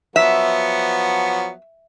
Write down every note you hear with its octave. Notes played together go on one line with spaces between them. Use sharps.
F3 F#3 B3 E5